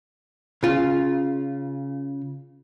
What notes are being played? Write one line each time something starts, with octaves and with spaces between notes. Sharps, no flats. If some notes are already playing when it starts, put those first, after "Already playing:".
C#3 F4